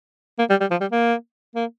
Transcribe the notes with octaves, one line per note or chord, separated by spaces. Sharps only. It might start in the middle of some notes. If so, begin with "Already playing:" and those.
A#3
G3
G3
F3
G3
A#3
A#3